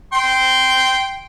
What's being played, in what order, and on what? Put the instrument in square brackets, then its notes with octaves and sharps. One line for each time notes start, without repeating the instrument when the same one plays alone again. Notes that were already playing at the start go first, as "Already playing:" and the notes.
[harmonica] G5 C6